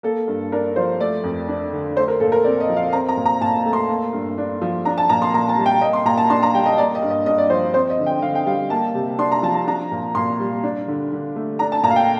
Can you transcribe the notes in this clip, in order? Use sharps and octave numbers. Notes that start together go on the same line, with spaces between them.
A#3 A4
G2
D4 A#4
F3 C5
A3 D5
F2
D4
D3
A3 C5
A#4
A#2 A4
A#4
C4 D5
D#5
F3
F5
C4 A#5
A#5
A#2
A#5
A#2 A5
A3
C6
A#3
G2
D4
F3
D4 A#5
A5
A#2 A#5
C6
A#2 A#5
A5
G3
G5
A#3 D#5
C6
A#2 A#5
A5
D4 C6
A#5
G3 G5
D#5
A#3 D5
D#5
G2
D#5
G2 D#5
D5
F3 C5
C4 C5
D#5
D3
G5
D3 F5
G5
G3 F5
A#3 A5
C3
D4 C6
A#5
F3 A5
A#5
D4 A#5
A#2
A#2 C6
G3
D4
D3
D3
A3
D4 A#5
A5
A#2 A#5
F5
G5